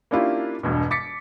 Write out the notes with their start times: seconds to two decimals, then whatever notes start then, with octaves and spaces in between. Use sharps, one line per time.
0.11 A#3 C#4 D4 E4 F4 G4
0.63 E1 G2 B2
0.91 D6 A6 B6 C#7